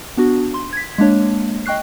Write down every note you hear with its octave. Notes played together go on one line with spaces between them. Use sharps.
B3 D4 F#4
C6
G#6 B6
G#3 A#3 D4 C#5
D#5 G5 C#6 F#6 C7